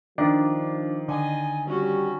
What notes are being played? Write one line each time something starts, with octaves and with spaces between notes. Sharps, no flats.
D#3 F3 D4
D3 D#5 G#5
G3 C#4 F#4